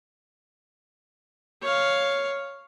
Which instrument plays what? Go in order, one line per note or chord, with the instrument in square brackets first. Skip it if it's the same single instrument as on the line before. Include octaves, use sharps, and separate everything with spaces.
[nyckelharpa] C#5 F5